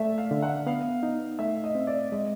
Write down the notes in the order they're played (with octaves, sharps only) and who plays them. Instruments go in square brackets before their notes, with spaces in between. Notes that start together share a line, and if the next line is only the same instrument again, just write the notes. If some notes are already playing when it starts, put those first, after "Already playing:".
Already playing: [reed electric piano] A3 [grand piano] D5 E5
[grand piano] F5
[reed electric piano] D3
[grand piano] F#5
[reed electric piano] B3 [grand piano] F5
[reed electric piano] D#4
[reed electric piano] A3 [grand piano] E5
[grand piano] D#5
[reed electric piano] C4
[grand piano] D5
[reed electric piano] G#3 [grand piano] D#5